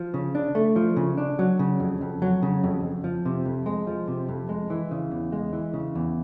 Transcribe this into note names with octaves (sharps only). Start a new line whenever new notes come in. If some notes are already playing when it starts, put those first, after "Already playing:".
Already playing: F3
C#3
D4
A3
F3
C#3
D4
F#3
C#3
F2
F2
F#3
C#3
F2
F2
F3
C3
F2
G#3
F3
C3
F2
G#3
E3
C#3
E2
G#3
E3
C#3
E2